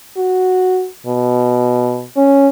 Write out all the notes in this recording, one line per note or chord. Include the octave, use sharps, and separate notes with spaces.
F#4
B2
C#4